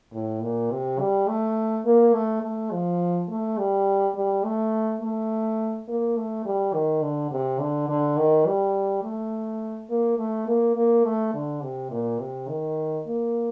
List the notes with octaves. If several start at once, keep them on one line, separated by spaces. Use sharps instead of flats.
A2
A#2
C3
G3
A3
A#3
A3
A3
F3
A3
G3
G3
A3
A3
A#3
A3
G3
D#3
D3
C3
D3
D3
D#3
G3
A3
A#3
A3
A#3
A#3
A3
D3
C3
A#2
C3
D#3
A#3